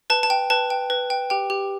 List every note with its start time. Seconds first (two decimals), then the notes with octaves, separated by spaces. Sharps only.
0.10 B4 A5
0.23 A5
0.30 G5
0.50 B4 A5
0.70 G5
0.90 B4
1.10 G5
1.30 G4 G5
1.50 G4